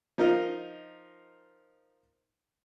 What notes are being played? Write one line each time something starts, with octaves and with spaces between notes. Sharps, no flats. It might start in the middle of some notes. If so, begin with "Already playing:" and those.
F3 D#4 F4 A#4 D#5